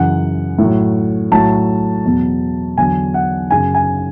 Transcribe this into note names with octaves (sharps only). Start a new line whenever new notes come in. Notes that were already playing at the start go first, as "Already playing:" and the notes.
Already playing: F#2 C#3 E3 F#5
A2 F#3
A2 F#3 A5
E2 B2 F#3
E2 D3 F#3 G#5
F#5
F#2 C#3 F#3 G#5
G#5